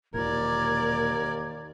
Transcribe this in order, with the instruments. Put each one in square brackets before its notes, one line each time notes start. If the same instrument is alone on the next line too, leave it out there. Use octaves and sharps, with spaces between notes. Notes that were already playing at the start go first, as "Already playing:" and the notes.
[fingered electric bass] E1 A#2 [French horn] D#2 [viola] A#4 D5 [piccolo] G#6